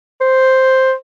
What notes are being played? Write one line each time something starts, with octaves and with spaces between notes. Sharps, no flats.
C5